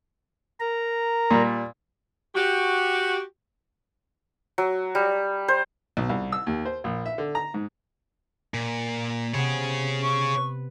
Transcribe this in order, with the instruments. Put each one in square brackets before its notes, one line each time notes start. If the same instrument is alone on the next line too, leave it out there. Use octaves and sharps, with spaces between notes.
[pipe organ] A#4 A#5
[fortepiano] A#2 G3
[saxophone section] F#4 G4
[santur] F#3
G3
C5
[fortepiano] B1
C2
E6
D#2
C5
A#1
E5
D3
A#5
G#2
[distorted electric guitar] A#2
[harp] C3 B3 [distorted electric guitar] G#4 C#5
[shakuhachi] C#6
[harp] B4